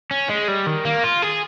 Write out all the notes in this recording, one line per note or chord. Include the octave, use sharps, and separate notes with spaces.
C#4
G#3
G3
D#3
A#3
F4
G#4